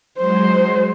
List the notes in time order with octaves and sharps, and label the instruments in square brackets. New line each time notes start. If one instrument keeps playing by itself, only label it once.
[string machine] F#3 G#3 [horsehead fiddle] C5